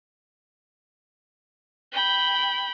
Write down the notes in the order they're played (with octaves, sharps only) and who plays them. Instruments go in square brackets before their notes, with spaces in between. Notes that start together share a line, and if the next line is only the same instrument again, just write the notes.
[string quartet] G5 B5